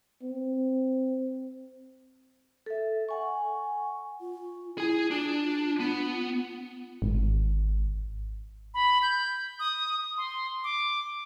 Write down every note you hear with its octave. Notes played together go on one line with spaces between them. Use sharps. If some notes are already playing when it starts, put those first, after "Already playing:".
C4
A4 E5
F#5 G#5 C#6
F4
E4 G#4 G#5
D4 F4
B3 F4
G#1
B5
G6
D#6
C6
D6